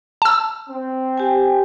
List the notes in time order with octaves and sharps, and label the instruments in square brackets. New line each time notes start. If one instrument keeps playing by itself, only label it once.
[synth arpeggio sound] A5 E6
[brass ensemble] C4
[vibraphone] G4 G5 G#5